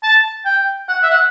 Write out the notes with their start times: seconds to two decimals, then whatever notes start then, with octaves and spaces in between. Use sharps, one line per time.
0.03 A5
0.45 G5
0.88 F#5
1.03 E5
1.10 F#5